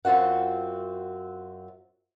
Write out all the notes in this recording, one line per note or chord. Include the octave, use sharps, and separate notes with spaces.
F#2 C4 F4 F#4 F#5